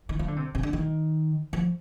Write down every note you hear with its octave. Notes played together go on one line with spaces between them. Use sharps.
D#3
F3
D3
C3
C3
D3
D#3
F3